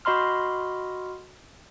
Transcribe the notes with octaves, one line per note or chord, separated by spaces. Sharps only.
F#4 D#5 B5 C6 F6